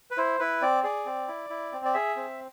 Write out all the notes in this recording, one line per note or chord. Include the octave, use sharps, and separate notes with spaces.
B4
E4 C5
E4 B4
C4 D5
G#4 D5
C4
E4
E4
C4
D5
G#4 E5
C4